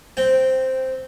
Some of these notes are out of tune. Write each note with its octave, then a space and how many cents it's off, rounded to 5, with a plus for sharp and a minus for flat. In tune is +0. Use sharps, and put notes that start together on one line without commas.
C4 +0 G5 -10